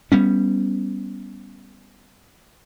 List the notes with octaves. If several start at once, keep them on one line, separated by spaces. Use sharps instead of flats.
G3 B3 C#4